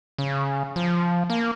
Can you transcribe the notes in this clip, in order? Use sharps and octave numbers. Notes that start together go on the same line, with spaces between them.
C#3
F3
A#3